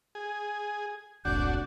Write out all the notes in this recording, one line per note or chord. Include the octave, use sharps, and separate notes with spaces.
G#4
E1 C2 A2 D4 F#4 G6